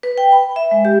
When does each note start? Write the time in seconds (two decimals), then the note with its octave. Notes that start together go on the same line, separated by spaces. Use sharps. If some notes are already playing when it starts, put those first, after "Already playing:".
0.03 B4
0.18 G5
0.32 B5
0.56 E5
0.71 G#3
0.85 G4